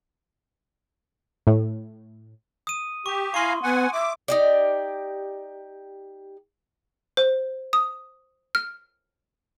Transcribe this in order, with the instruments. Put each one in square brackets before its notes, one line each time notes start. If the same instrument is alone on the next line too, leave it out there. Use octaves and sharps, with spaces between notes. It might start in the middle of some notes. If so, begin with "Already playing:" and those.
[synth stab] A2
[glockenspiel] D#6 D#7
[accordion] G4 [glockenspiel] C#6
[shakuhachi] E4 [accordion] F5 G#5 A#5 [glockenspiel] C6 C#6
[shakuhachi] B3 [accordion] F#5 G#5
[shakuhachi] E5 [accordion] D6
[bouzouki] D#4 G4 D5
[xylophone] C5
D#6
F6